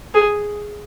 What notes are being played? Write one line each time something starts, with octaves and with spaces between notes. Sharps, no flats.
G#4